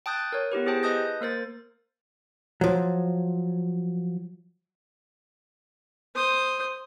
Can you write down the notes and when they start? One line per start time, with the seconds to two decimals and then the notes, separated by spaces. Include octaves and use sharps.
0.06 G5 A5 D#6 F#6 G6 A6
0.32 A#4 C#5
0.52 B3 E4 G4 B4
0.66 E4 G4 G#4 C5 G5 A5
0.83 B4 D#5 A5 D#6 G6 A#6
1.21 A#3 A#4 C5 A6
2.61 F3 F#3
6.15 C5 D#6